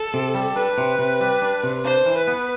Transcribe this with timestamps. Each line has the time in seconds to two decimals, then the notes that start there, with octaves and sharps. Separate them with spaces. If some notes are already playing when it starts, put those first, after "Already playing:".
Already playing: A4
0.14 C3
0.35 G3
0.56 D4 B4
0.78 C3
0.99 C3
1.21 G3
1.42 D4
1.63 C3
1.84 D4 C5
2.06 E3
2.18 B4
2.28 B3